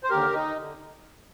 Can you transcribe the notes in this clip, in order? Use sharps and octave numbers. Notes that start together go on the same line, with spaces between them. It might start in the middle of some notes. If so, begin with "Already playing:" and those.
C5
D#2 D3 G4 A#4
D#4
D3